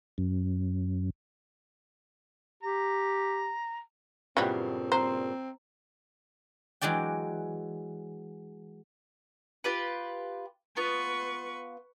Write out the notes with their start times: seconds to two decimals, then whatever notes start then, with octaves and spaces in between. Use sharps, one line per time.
0.18 F#2
2.63 G4 A#5
4.37 G2 A#2 C#3 E3 F#3 G3 C4
4.92 C4 C5 A#5
6.81 E3 F#3 G#3 D5 G5
9.64 F4 G4 B4
10.77 B3 F4 B4 C#6